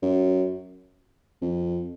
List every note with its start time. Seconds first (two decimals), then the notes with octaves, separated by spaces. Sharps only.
0.02 F#2
1.42 F2